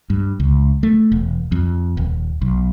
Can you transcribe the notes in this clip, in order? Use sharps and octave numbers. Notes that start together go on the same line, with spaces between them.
G2
C#2
A3
E1
F2
D#1
B1